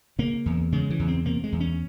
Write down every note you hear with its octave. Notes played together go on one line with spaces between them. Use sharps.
C#3 A#3
E2
C#3 G#3
E3
E2
C4
C3 A#3
G#3
E2
C#4